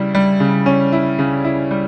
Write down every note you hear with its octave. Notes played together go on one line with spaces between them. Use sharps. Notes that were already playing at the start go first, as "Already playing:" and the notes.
Already playing: C#3 G3 E4
G3
C#3
C#4
E4
C#3
E4
G3